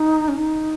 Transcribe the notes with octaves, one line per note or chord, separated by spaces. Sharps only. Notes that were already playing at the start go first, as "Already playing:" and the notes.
Already playing: D#4
C#4
D#4